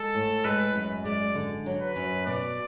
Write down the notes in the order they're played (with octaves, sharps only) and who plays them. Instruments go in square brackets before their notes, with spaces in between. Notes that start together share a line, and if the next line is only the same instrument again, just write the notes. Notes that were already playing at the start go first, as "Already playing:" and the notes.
Already playing: [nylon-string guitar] G#3 [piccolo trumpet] A4
[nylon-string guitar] A2
[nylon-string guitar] G#3 [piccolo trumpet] B4
[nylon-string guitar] F#2
[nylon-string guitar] G#3 [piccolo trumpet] D5
[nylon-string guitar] D3
F#3
[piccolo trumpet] B4
[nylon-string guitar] F#2
[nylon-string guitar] B2 [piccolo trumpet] D5